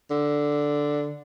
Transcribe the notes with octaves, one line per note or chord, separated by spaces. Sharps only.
D3